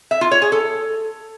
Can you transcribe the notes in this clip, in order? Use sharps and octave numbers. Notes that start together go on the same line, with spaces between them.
E5
F4
C#5
G#4
A4